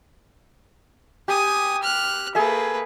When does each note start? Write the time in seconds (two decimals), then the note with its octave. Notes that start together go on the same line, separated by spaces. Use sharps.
1.28 G4 G#5 D#6
1.83 F6 F#6
2.35 A#3 G#4 A4 B4 E5